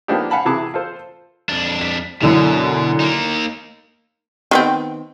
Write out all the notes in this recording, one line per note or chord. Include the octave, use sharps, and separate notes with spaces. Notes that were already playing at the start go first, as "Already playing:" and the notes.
F3 A#3 B3 D4 D#4 G4
F5 F#5 G#5 A5 B5
C3 E3 G#4 A5 D6
F4 A4 C5
F2 D4
B6
F#2 B2 D3 E3
A#3 D#4
D#3 B3 C4